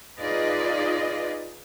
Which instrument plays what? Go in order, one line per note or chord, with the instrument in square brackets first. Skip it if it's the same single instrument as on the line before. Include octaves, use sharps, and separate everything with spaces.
[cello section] D#4 F4 G#4 B4 D5 D#5